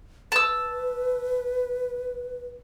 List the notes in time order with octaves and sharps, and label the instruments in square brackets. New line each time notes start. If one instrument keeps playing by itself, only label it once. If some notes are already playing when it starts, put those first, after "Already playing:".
[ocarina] B4 [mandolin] A5 E6